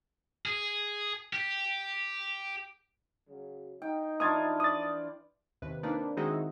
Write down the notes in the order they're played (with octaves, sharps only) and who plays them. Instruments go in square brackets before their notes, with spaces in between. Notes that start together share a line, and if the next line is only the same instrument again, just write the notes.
[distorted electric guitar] G#4
G4
[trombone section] C#3 F#3
[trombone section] D#4 [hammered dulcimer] G5
[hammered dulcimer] E3 D4 F4 [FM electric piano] D#6 G#6 A6
[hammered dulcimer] D5 [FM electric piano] D#6 A6
[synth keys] D#2 C3 B4
A#3 C4 D4 D#4 B4
D#3 G#3 C4 D#4 E4 F#4